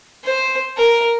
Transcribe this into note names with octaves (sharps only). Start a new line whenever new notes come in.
C5
A#4